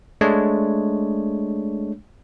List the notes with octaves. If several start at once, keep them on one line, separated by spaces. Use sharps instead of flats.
G#3 A3 D4 C#5